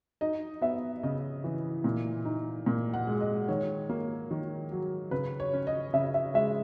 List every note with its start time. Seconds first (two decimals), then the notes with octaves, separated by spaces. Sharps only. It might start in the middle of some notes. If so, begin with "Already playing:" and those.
0.21 D#4 D#5
0.61 B3 E5
1.03 C#3 D#5
1.44 E3
1.84 A#2
2.25 D#4
2.66 A#2
2.94 F#5
3.07 G#3
3.20 D#5
3.48 D#3 C#5
3.89 A#3
4.31 D#3
4.72 F#3
5.11 C#3 B4
5.40 C#5
5.53 C#4
5.67 D#5
5.93 C#3 E5
6.14 E5
6.34 G#3 E5